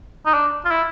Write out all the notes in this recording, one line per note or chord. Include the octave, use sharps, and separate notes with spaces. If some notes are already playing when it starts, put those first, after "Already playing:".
D#4
D4
F4
E4